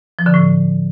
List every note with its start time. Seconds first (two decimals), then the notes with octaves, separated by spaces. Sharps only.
0.19 F3
0.26 D3
0.34 A2